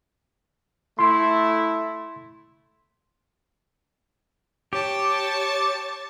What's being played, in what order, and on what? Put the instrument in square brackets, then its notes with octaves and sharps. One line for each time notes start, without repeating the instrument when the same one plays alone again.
[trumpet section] A3 E4 [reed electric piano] C6
[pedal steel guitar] G4 [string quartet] C#5 A5